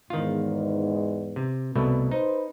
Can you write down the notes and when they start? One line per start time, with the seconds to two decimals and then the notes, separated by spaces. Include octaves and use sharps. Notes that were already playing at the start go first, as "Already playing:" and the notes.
0.10 E2 G#2 D#3 F4
1.36 C3
1.75 C2 B2 A3
2.11 D#4 B4 C5